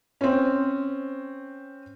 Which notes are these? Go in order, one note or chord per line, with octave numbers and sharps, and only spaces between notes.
C4 C#4